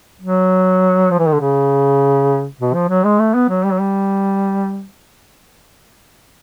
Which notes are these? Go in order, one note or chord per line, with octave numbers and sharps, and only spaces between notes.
F#3
F3
E3
D#3
D3
C#3
B2
F3
F#3
G#3
A3
B3
F#3
G3
F#3
G3